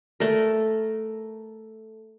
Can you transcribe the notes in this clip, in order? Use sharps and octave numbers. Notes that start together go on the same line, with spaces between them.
A3 A#4